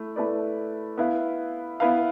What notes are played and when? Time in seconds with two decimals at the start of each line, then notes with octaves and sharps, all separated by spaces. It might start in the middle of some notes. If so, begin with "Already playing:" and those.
Already playing: A3 E4
0.16 A3 E4 B4 D5
0.98 B3 E4 B4 F5
1.80 B3 E4 B4 F5